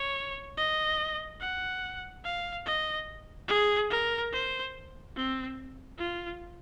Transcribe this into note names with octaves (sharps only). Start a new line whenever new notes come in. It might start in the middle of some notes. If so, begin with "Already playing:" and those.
Already playing: C#5
D#5
F#5
F5
D#5
G#4
A#4
C5
C4
F4